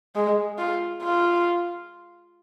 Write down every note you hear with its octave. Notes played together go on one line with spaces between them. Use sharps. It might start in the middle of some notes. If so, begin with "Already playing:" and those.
G#3
F4
F4